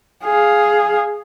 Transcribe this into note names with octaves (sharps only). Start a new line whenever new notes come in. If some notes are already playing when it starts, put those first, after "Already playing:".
G#4 F5